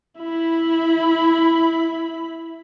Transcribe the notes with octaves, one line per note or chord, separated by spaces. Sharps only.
E4 B5